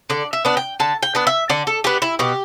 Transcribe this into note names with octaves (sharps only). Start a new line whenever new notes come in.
D3 D5
E5
B3 D4
G5
D3 A5
G5
B3 D4
E5
D3 D5
A4
B3 D4 G4
E4
B2 G4